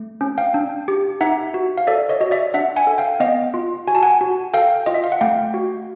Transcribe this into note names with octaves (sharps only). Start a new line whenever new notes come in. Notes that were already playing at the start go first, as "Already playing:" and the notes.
Already playing: A3
C#4
F5 G5
D4
G4
D#4 E5 F#5
F#4
F5
A4 D5 E5
C#5 D#5
F#4 D#5
D5 E5
D4 E5 F#5
F#5 G#5
A4
F5 G5
B3 D#5 F5
F4
F#4 G#5
A5
F#5 G#5
F#4
A4 F5 G5
F4 D#5
E5
F5
F#5
A3 F5 G5
F#4